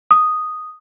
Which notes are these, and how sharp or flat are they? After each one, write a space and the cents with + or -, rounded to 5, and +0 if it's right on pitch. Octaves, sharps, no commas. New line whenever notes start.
D#6 -5